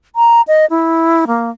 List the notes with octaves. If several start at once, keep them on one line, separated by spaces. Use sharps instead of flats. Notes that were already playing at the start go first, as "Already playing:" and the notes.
A#5
D#5
E4
A#3